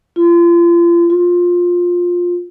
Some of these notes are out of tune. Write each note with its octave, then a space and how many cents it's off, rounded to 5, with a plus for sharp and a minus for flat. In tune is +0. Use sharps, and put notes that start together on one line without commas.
F4 -35
F4 +15